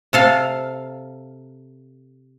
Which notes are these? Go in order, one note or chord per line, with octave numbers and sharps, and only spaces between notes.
C3 A4 F5